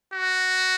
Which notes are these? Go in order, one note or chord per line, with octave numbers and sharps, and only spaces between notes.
F#4